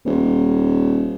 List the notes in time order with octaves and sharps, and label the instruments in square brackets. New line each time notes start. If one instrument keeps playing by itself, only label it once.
[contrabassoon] D#1